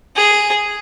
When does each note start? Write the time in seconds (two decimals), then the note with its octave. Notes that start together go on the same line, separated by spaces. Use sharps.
0.16 G#4